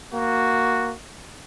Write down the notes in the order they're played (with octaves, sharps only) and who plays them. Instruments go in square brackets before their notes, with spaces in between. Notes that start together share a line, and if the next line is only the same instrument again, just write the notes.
[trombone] A#3 [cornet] F#4